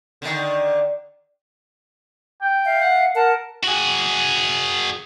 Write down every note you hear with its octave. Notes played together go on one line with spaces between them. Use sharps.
D3 D#3
G5
E5 F5
F#5
A#4 F#5 A5
F#4 G#4